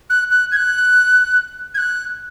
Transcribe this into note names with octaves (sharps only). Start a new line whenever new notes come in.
F#6
F#6
G#6
F#6
G#6
F#6